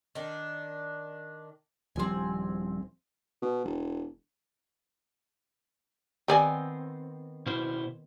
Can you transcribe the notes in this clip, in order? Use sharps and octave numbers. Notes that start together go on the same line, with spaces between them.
D#3 D4
D#1 F3 G3 C4 G#5
B2
E1
D#3 B3 C4 G4 D5 G#5
B2 E4 C5